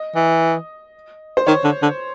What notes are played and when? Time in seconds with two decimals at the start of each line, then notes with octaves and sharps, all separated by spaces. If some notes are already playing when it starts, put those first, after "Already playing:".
Already playing: D#5
0.16 E3
1.37 C5
1.47 D#3 C#5
1.64 D3
1.83 D3